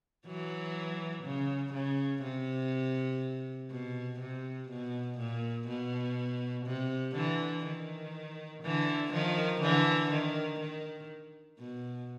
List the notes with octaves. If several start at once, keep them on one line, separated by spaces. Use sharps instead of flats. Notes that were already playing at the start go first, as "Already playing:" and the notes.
E3 F#3
C#3
C#3
C3
B2
C3
B2
A#2
B2
C3
D3 E3
D#3
D3 E3
D#3 F3
D3 E3
D#3
D#3
B2